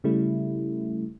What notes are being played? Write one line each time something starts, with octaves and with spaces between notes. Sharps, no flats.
C#3 G3 A3 E4